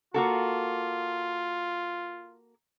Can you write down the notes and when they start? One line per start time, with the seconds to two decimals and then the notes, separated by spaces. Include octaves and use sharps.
0.14 A#3 F4 F#4 A4